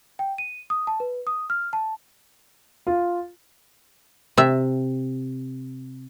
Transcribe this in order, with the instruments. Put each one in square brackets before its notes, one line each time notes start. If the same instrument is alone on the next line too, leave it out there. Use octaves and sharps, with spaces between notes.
[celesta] G5
D#7
D#6
A5
B4
D#6
F6
A5
[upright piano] F4
[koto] C3 E5